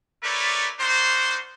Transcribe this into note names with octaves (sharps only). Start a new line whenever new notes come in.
A3 E4 A#4 B4 C#5 D5
D4 D#4 F#4 A#4 C5